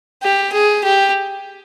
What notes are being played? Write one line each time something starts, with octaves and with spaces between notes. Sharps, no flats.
G4
G#4
G4